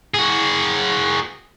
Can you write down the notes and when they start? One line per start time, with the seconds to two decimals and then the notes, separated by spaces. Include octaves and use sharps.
0.14 F#4 G#4